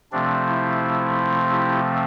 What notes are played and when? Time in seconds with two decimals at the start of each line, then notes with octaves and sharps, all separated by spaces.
0.12 C3 F3 A3 C4 D4
0.46 E4
1.49 E4 G4